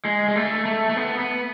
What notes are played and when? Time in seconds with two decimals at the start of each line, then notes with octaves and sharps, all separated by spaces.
0.05 G#3
0.29 G#3
0.36 A3
0.66 A3
0.90 A3
0.97 B3
1.19 B3